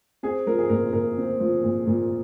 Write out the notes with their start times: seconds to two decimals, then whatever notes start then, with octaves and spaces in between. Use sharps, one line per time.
0.23 C4 G#4
0.47 F3 A#4
0.59 G#4
0.69 A#2 A#4
0.93 A#2 A#4
1.17 C4
1.40 F3
1.64 A#2
1.87 A#2